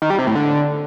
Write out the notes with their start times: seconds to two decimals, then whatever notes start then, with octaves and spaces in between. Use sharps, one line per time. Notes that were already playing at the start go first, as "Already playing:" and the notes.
0.02 D#3
0.10 G3
0.19 C3
0.27 A2
0.35 D3